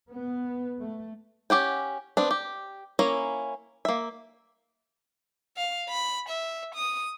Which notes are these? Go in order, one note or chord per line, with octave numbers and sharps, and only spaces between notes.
B3
A3
C#4 G4 F#5 G5
B3 C4 D4
G4
A#3 C#4 E4 A#5
A#3 E5
F5
B5
E5
D#6